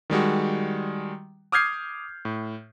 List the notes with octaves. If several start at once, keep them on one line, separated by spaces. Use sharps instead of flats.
D#3 G3 G#3 F#4
D6 D#6 F6 G6 G#6 C7
A2